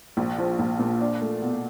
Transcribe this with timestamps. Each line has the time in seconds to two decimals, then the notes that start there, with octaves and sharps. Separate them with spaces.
0.17 A#1
0.38 F3
0.59 A#1
0.79 A#2
1.01 D4
1.21 A3
1.42 B2